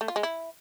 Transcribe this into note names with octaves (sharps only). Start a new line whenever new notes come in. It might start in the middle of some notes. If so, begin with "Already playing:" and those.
A3
F4
G#3
E4